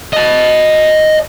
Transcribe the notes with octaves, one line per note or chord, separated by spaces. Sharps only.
D#5 A5